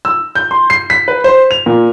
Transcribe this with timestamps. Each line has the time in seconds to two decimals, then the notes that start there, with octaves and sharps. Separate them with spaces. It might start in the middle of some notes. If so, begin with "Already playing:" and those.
0.05 E6
0.35 G6
0.51 C6
0.70 C7
0.90 B6
1.08 B4
1.24 C5
1.51 F7
1.66 A#2